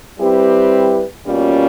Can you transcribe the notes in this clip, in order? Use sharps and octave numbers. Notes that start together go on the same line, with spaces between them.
G3 C4 E4 G4 B4
B2 G3 A#3 C#4 F4